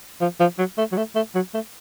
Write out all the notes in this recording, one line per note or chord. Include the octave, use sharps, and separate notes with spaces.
F3
F3
F#3
A3
F#3
A3
A3
F#3
A3